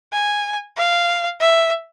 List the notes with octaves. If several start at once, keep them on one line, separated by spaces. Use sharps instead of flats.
G#5
F5
E5